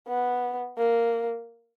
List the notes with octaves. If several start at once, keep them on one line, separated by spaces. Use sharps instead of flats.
B3
A#3